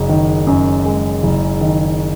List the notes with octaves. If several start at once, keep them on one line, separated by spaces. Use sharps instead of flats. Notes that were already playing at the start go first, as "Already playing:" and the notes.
Already playing: F#1 G#3
D#3
F#2
G#3
F#1
D#3